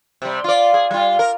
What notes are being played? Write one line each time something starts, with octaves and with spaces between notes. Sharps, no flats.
C3 G3
F4 D5
G#4
G3 F4
A#4